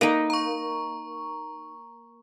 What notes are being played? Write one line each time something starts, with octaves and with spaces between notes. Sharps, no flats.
A#3 D#4 B4
A#5 C#6